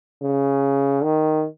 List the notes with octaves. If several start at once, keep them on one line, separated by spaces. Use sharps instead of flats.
C#3
D#3